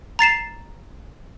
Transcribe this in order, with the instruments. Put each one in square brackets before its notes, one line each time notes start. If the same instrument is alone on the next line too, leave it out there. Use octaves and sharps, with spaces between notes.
[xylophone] A#5 A6 C7 E7